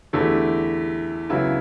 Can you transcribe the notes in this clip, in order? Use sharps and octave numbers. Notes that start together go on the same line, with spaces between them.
E2 D3 A3 E4 G4
C#2 C#3 F#3 B3 E4